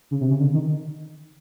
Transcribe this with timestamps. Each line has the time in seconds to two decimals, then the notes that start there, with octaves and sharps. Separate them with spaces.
0.11 C#3
0.21 C3
0.30 C#3
0.39 D3
0.54 D#3